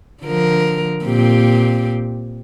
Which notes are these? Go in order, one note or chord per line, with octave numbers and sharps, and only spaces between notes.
D3 F3 A#4
A#2 C4 G4